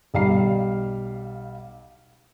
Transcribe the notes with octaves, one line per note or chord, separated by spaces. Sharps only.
B1 G3 F5 C7